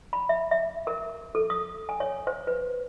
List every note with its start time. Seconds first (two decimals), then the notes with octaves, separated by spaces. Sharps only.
0.13 B5
0.29 E5
0.51 E5
0.87 A#4
1.35 A4
1.50 D#6
1.89 G#5
2.00 C#5
2.27 C5
2.47 B4